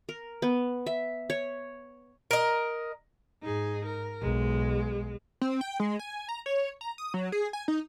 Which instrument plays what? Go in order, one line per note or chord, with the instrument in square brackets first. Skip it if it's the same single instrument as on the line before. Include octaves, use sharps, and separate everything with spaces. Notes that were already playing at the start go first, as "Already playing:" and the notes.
[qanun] A#4
B3
E5
C#5
[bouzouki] A#4 D#5
[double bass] G#2 [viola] D#4 G#4
[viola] A#4
[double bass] B1 [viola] G#3
[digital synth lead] C4
G5
G#3
G#5
A#5
C#5
A#5
D#6
F#3
G#4
G#5
D#4